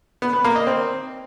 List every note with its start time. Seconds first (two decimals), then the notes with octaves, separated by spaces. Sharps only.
0.22 B3
0.33 B3
0.44 A#3
0.56 D#5
0.67 C4